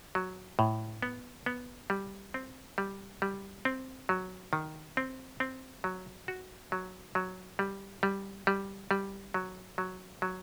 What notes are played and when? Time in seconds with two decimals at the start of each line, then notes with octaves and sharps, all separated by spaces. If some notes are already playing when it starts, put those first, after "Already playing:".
0.15 F#3
0.59 A2
1.02 B3
1.46 B3
1.90 G3
2.34 C4
2.78 G3
3.22 G3
3.65 C4
4.09 F#3
4.53 D#3
4.97 C4
5.40 C4
5.84 F#3
6.28 F#4
6.72 F#3
7.15 F#3
7.59 G3
8.03 G3
8.47 G3
8.91 G3
9.34 F#3
9.78 F#3
10.22 F#3